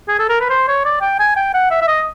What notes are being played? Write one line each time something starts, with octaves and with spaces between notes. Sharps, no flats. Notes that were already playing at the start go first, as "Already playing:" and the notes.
G#4
A4
A#4
B4
C5
C#5
D5
G5
G#5
G5
F#5
E5
E5
D#5